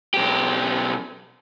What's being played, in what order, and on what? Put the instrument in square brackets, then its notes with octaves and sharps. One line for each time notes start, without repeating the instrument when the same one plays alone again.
[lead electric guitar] B1 G4